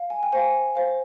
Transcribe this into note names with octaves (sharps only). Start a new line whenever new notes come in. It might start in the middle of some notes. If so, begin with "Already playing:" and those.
Already playing: F5
G#5
G5
C5 F5 G#5
C5 F5